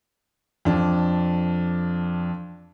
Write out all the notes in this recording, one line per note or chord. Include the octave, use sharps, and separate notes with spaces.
F2 D4